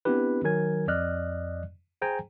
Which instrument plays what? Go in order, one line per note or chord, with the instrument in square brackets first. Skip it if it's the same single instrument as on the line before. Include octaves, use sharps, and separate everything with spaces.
[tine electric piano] B3 C4 D4 E4 G4 B4
D#3 F#3 A#4 G#5 G#6
F2 D5 D#5 F6 F#6
G#4 C5 G5 G#5 A#5